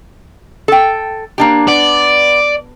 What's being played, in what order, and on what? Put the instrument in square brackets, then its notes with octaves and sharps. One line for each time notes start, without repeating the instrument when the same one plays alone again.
[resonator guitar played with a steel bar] A4 G5
A#3 D4 G4
[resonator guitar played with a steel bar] B3 [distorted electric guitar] D5